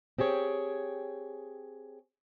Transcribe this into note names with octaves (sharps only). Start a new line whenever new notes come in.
C4 G4 G#4 C#5